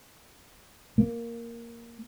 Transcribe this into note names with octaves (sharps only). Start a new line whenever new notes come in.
A#3